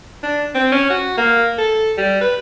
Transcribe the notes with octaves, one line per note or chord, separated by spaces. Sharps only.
D4
C4
C#4
F#4
A#3
A4
G3
B4